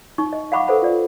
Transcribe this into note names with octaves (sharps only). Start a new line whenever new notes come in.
D#4 C#6
D#5
F5 F#5 B5 C#6 D6
A4 B4 C5 F#5 B5
F4 D5